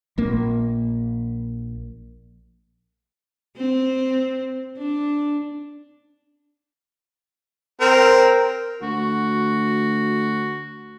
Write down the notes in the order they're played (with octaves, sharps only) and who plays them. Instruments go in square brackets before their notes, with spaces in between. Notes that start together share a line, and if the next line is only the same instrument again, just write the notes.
[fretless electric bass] A#1 A#3
[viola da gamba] C4
D4
[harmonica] C4 A#4
[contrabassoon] D2 [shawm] F#4